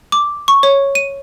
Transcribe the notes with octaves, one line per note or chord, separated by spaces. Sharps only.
D6
C#6
C#5
D#7